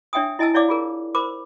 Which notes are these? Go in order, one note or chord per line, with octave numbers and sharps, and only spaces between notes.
D4 C#5 E5 G5 G#5 D#6
E4 D#5 G#5 A5 E6
E4 C#5 D5 F5 D6
F4 G#4 A#4
A#4 C5 B5 D6